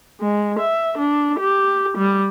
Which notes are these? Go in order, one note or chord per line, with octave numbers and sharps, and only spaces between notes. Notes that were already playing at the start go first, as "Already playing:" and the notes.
G#3
E5
D4
G4
G3